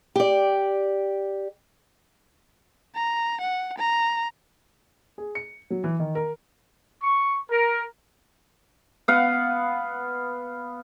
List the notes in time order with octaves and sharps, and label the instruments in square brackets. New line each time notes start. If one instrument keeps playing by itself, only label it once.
[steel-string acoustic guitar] G4 D5
[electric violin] A#5
F#5
A#5
[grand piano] G#4
C#7
F#3
E3
D#3
A#4
[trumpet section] C#6
A#4
[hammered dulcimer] B3 F5 F#5